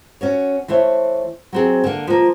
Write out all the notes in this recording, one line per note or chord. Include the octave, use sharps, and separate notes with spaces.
C#4 F#4 C#5
E3 A3 C5 C#5 E5
F#3 C4 G#4
D3 A#3
F3 A#3